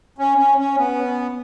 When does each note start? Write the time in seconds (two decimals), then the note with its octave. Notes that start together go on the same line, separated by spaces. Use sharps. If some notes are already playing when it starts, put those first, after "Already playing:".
0.18 C#4
0.38 C#4
0.58 C#4
0.78 B3